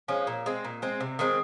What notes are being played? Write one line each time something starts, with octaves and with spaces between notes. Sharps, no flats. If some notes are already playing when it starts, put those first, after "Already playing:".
F3 G#3 C#4
A#2
G#3 C4
A#2
G#3 C4
C3
D#3 G#3 C4